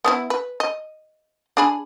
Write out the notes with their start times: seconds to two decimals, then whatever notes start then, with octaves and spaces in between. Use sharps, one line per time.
0.04 B3 C#4 E4
0.30 B4
0.60 D#5
1.57 D4 G#4 B5